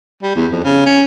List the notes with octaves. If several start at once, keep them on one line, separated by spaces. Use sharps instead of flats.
G3
E2
F2
C#3
C#4